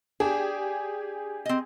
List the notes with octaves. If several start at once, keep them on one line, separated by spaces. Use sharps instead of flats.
D4 G4 G#4
C4 D#5